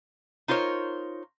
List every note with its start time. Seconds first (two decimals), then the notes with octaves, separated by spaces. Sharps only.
0.48 D#4 F4 A#4 C5 C#5